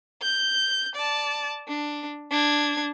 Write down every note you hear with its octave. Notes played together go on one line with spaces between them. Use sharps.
G6
D5 A5
D4
D4 G#6